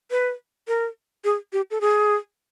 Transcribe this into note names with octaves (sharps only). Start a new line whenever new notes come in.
B4
A#4
G#4
G4
A4
G#4